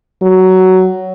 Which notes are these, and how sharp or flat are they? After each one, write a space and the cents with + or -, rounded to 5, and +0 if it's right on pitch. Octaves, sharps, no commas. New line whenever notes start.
F#3 +10